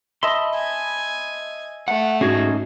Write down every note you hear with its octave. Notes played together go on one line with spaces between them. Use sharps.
D#5 E5 A5 B5 C6
G#5
A3 F#5
G#2 C#4 D#4 F#4 G#4